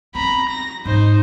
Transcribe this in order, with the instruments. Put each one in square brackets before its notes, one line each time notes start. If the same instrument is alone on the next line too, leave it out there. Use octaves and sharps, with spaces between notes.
[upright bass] C4 [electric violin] A#5 B5
[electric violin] A#6
[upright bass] G#2 [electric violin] D#4 C5